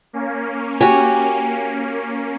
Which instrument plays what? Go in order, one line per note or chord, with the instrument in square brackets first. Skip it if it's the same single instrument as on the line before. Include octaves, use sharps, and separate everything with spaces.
[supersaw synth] A#3 C#4
[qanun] F#4 G4 C#5 [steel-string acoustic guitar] G#5